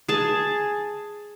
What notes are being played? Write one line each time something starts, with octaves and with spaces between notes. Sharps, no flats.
G#4 A5